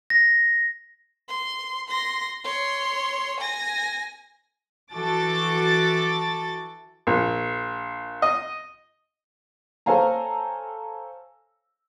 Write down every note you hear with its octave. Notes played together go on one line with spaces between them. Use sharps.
A#6
C6
C6 A#6
C#5 C6
G#5 A#6
E3 F#4 A4 D6 A6
A#1
D#5
A4 C5 C#5 F5 G#5 A#5